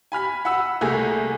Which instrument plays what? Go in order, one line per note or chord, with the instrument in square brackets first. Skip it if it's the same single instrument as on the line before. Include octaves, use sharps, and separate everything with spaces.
[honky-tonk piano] G#5 B5 F6 B6
F#5 B5 E6
C2 A3 A#3 G#4 G#5 B6